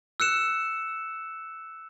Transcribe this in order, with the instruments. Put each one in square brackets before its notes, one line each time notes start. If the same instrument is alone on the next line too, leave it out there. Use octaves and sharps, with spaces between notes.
[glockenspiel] E6 F#6 C#7 E7